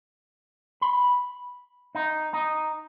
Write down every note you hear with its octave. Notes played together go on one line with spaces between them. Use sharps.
B5
D#4
D#4